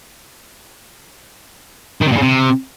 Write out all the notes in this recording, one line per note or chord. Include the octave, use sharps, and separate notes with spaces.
D#3
C3
A#2
C#3
C3